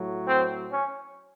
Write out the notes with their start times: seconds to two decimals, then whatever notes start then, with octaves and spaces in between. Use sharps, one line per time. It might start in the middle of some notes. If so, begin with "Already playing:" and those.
Already playing: A2 F#3
0.28 C4
0.72 C#4